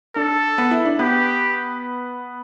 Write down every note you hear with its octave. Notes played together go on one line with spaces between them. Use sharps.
D4 A4
B3
E4
D4
B3 G4